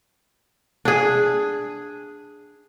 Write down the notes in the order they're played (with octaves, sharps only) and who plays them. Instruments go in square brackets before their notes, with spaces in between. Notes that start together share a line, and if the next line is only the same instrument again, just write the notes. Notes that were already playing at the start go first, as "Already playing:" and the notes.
[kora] D4 G#4